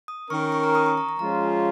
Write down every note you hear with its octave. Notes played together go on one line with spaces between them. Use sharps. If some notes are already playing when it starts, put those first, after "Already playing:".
D#6
D#3 C#4 A#4 C#6
C#6
A#5
D#6
C#6
A#5
A#5
F3 G#3 C#4 F4 A#5